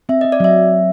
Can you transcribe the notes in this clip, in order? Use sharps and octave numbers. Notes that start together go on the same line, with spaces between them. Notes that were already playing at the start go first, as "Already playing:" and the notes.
C4 E5
D#5
C4
D5
F#3 E5